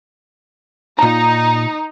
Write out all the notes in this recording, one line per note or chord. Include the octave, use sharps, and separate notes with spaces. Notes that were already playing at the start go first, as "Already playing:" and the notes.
A#2 D#4 A#5